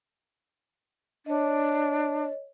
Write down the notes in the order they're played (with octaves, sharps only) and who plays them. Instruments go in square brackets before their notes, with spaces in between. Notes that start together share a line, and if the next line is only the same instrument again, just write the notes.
[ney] D4 [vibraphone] C#5 D#5